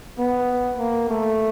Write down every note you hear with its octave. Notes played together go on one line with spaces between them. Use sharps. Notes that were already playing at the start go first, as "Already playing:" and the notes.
B3
A#3
A3